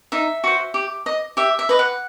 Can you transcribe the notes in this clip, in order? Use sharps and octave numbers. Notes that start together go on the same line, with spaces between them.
D#4 E5
F#4 C5
G4
D#5
G4 E5
E5
B4 D#5
F#5